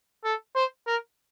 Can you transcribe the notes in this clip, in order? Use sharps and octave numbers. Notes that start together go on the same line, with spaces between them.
A4
C5
A#4